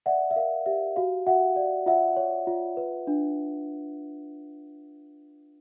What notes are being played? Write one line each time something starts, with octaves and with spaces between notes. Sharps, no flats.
D5 E5 F#5
E5
A#4 F5
G4 E5
F#4 F5
F#4 E5 F#5
D5
F4 E5 F#5
C#5
F4
B4
D4